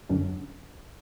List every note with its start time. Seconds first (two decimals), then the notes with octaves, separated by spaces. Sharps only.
0.09 F#2 D3 F#3 C#4